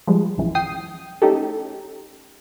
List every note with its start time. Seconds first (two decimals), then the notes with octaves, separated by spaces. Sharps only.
0.07 F3 G3 G#3
0.37 A#1 F#2 E3 F3
0.55 G5 D#6 C7
1.22 A3 C#4 D#4 G4 A4